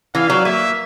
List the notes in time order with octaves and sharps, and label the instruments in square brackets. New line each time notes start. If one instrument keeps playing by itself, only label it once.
[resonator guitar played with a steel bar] E3 [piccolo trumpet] F5
[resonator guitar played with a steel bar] F#3
[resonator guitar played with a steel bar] A#3 [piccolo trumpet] E5